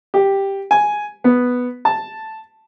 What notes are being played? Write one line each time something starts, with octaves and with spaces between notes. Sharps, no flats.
G4
G#5
B3
A5